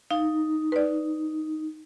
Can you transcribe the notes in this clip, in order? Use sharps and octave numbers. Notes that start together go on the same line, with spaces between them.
D#4 F5
B4 D5